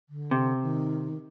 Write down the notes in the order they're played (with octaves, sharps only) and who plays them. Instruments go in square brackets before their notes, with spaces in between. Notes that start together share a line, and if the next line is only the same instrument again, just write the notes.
[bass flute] D3
[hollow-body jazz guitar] C3
[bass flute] D#3